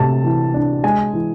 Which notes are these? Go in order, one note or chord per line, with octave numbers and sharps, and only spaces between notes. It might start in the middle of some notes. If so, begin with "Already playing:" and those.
Already playing: C3 A3 A5
E3
D4
G#3 G#5
E3